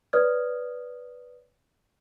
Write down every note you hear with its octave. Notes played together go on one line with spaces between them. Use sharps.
B4 C#5 D5 D#6 F6 G#6